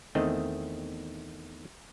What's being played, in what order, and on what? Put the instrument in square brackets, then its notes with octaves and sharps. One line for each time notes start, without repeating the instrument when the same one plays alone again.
[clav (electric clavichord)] E2 D#3 A3 C4 D#5